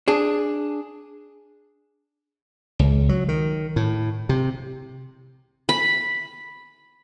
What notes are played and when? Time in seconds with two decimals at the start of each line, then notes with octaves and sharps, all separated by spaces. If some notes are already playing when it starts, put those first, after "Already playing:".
0.08 D4 G#4
2.79 C#2
3.09 F#3
3.28 D#3
3.76 A2
4.29 C3
5.69 B5